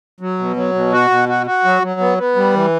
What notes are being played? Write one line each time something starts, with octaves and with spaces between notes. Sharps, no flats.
F#3
B2
F#3
B2
F#4
B2
F#4
F#4
F#3
F#3
B3
B3
G3
E3